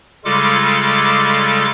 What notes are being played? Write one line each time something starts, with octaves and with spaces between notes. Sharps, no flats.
C#3 G3 G#3 F4 A4 D6